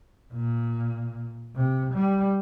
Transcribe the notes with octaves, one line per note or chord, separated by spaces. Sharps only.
A#2
C3
G3